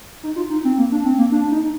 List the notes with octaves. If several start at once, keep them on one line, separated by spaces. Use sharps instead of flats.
D#4
F4
D#4
C4
A#3
D4
C4
A#3
D4
D#4